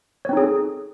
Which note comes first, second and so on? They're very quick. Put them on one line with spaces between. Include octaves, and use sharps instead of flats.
C#5 C4 D#4 G#4 A4